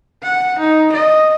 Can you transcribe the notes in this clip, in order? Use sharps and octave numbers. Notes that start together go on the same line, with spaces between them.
F#5
D#4
D#5